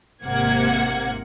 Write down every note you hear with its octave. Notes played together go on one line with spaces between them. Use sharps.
G#1 C3 A#3 F#5 G#6